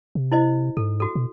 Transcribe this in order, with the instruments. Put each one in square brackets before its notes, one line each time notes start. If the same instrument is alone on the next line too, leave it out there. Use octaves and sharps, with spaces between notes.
[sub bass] C3
[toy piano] E4 C5 D#5
[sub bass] G#2 [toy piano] A4
[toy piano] F#4 A4
[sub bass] B2